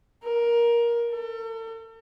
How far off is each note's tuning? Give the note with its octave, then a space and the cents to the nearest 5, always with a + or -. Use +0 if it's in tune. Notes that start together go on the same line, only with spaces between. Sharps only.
A#4 +15
A4 +40